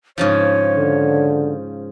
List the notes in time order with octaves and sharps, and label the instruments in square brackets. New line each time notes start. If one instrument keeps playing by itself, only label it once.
[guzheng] G#2 C#3 F3 [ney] C#5
[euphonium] D3